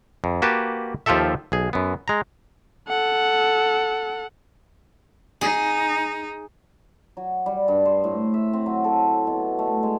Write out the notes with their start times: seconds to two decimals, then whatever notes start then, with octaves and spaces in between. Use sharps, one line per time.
0.24 F2
0.42 A#3 F#4 G4 B4 A5
1.06 D#2 F3 F4 G4 A4 E5
1.52 B1 G#4
1.73 F#2 B3
2.08 G#3 A#5
2.88 A4 F#5
5.41 D#4 G#4
7.17 F#3
7.46 G3
7.68 G2
7.85 C5
8.04 A2
8.34 E5
8.53 C4
8.66 F#3
8.84 A4
9.27 B2
9.59 A3
9.83 G#3